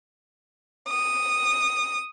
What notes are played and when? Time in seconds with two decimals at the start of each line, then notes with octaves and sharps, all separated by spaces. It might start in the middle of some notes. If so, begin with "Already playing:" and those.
0.90 D#6